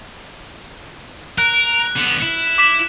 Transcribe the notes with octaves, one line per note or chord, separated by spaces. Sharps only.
A#4 F#6
D3 B3
E4
D6 B6 E7